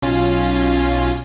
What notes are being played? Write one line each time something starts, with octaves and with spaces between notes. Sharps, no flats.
B1 C#4 F4